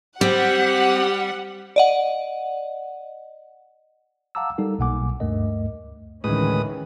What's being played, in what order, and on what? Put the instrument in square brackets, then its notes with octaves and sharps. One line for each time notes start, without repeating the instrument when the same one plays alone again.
[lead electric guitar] G3 [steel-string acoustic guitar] C4 [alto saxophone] G4 [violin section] F#5
[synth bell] D5 D#5 F#5
[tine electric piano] F5 F#5 A5 A#5 D6 E6
G3 D#4 A4 A#4
B1 B2 A#3 F#5 G#5 D6
D2 G2 A3 A#4 D#5
[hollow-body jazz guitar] D2 A2 [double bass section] D#3 E3 C#4 [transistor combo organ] G#3 B4 D#6